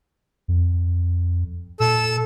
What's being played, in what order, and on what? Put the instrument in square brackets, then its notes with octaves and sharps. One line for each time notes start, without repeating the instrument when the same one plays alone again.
[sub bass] F2
[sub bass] A#2 [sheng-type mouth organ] A4 E6